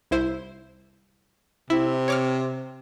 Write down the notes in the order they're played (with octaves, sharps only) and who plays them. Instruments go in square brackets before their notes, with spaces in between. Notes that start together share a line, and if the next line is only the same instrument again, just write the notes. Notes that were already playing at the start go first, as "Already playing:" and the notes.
[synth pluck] C2 E4 C5
[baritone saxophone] C3 [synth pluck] E4
[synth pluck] C#5 D6 F6